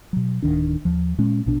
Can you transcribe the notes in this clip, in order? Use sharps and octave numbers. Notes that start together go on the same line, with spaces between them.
B2 F#3
D1 G#1 D#3 D4
D#2 F3
A#2 G#3 C#4
A#1 B2 D4